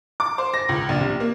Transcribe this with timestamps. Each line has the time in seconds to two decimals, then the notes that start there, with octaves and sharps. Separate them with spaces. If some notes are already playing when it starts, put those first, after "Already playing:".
0.20 D6
0.38 C5
0.54 A#6
0.69 C#2
0.89 A#1
1.00 C3
1.20 A#3